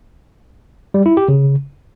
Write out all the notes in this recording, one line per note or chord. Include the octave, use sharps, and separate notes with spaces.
G3
E4
G4
C#3